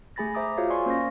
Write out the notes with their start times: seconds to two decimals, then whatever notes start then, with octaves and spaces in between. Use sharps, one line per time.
0.16 A3 G#4 G#5 B5 A6 A#6
0.34 C5 E5 A#5 D6 D#6
0.57 F4 F#4 G#4 C5 C#5 F5
0.70 D5 F5 G#5 C6 C#6
0.86 A#3 C#4 C5 F5 C#6 A#6